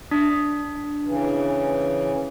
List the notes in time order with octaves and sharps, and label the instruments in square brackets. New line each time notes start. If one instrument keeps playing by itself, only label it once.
[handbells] D4
[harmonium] C#3 E3